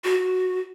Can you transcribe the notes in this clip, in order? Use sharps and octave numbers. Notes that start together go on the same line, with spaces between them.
F#4